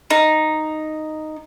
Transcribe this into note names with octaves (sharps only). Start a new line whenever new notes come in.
D#4